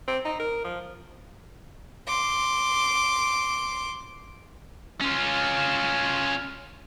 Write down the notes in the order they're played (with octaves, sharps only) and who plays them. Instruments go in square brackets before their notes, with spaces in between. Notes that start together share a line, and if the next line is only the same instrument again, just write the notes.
[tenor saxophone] C4
D#4
A#4
F3
[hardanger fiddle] C6 D6
[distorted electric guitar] C#4 F4